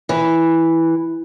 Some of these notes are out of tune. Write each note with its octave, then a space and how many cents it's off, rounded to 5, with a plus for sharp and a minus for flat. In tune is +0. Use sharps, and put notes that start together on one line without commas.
E3 -5